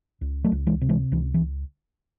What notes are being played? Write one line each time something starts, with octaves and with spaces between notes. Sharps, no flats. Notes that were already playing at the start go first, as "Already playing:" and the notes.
C#2
F#3 A3
C#2
E3 G#3
C3
E3 G#3
C#2 E3
E3